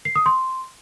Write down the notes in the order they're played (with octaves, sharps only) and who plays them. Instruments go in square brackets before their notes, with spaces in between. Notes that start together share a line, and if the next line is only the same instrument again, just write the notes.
[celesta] C7
D#6
C6